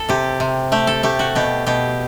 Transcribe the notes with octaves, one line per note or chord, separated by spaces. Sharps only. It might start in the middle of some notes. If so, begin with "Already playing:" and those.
Already playing: A4
C3 G4
C3
A3 G4
A4
A3 G4
F#4
B2 G4
B2 G4